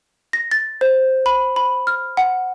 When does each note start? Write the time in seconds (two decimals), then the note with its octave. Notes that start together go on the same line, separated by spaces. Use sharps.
0.33 A#6
0.51 A6
0.81 C5
1.26 B5
1.56 B5
1.87 F6
2.17 F#5